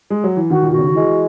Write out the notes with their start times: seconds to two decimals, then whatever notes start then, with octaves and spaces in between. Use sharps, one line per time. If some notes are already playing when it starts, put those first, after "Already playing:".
0.10 G#3
0.24 F#3
0.37 E3
0.50 D#3 F#4
0.62 A#2
0.70 B2 F#4
0.79 C#3
0.86 D#3
0.95 E3 G#3